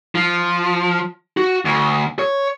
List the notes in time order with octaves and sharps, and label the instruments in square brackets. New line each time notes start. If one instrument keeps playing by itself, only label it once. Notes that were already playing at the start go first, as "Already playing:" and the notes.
[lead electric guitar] F3
F#4
D2
C#5